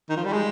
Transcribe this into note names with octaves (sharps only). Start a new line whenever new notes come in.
D#3
F3
G3
G#3